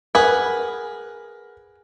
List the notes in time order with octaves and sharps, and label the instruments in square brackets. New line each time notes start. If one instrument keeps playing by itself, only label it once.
[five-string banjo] G#4 B4 [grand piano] A#4 F#5